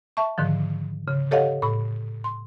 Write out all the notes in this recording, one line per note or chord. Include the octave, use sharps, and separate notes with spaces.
E5 A5 C#6
G#2 D3 D#3 F3
C#3
G4 A4 C#5 D#5 F5 F#5
A2 B5
C6